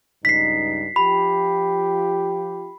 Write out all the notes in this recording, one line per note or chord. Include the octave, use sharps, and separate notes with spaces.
C#2 G2 D#4 B6 C7
F3 F4 G4 B5